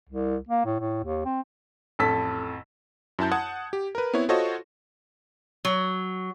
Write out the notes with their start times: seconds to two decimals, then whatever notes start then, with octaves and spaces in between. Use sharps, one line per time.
0.09 C2
0.49 A#3
0.66 A2
0.80 A2
1.04 D#2
1.25 C4
1.99 A1 F2 A4 A5 E6 B6
3.19 F#2 E4 A5 G6
3.32 F#5 A5 D#6 G#6
3.73 G4
3.95 A#4 B4
4.13 B3 C4 E4 C#5
4.29 F4 F#4 A4 C5 C#5 D#5
5.65 F#3